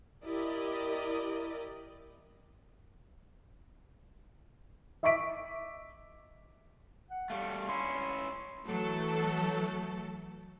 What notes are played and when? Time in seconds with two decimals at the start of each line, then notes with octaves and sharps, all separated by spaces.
0.25 E4 G4 A#4 D5 D#5
5.03 D#5 E5 C#6 D6 B6 D7
7.11 F#5
7.30 G3 A3 F5
7.69 C#4 E4 C6
8.66 E3 F#3 A3 A4